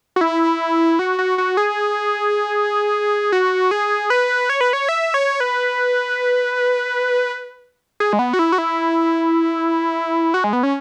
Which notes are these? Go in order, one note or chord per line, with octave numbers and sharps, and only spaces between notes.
F#4
E4
F#4
F#4
F#4
G#4
F#4
G#4
B4
C#5
B4
C#5
E5
C#5
B4
G#4
G#3
B3
F#4
E4
F#4
E4
F#4
G#3
B3
C#4